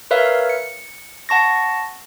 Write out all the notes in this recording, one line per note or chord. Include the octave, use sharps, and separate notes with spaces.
A#4 B4 C#5 E5 F5
C#7
F#5 A5 C#6 A#6